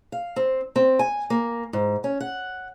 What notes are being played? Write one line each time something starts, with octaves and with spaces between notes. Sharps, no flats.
F5
C4
C4
G#5
A#3
G#2
C#4
F#5